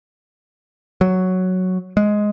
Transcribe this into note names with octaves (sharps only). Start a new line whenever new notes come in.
F#3
G#3